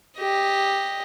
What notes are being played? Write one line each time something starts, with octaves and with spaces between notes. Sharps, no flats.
G4 D#5